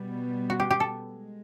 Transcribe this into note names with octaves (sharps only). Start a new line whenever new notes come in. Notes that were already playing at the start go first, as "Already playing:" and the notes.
Already playing: B2 G3 B3
F#4
G4
G4
A4
G#3